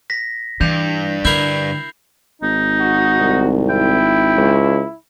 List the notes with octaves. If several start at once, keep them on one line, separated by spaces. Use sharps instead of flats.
A#6 B6
G2 E3 G6 F7
D3 E4 A#4 G6 C7
G#1 D#4
F#4
C2
E4 G5
C#2